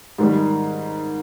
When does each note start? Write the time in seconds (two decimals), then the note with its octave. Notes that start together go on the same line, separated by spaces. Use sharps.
0.18 G#2 D#3 G3